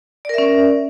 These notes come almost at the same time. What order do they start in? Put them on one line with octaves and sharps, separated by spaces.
D5 A#4 E5 C#4